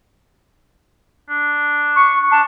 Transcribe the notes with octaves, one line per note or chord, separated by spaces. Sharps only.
D4
C#6
D4 A5